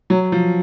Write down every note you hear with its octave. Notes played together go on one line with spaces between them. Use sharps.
F#3
F3